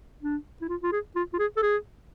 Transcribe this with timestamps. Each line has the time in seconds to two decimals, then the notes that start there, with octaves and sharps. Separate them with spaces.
0.22 D4
0.62 E4
0.69 F4
0.83 F4
0.92 G#4
1.16 F4
1.33 F4
1.39 G#4
1.57 A4
1.63 G#4